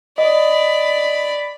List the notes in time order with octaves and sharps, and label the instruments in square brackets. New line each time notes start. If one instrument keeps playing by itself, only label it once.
[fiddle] D5 B5 [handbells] D#5